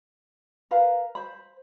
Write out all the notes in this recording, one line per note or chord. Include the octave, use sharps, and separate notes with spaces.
A#4 B4 F5
C5 B5